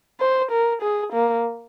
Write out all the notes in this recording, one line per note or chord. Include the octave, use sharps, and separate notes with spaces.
C5
A#4
G#4
A#3